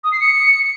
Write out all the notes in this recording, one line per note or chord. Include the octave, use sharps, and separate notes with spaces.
D#6
C7
C#7